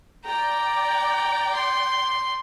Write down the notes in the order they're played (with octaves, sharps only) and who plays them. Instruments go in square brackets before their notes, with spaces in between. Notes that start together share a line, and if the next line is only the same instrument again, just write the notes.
[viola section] D5 G5 [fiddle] A#5
[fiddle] C6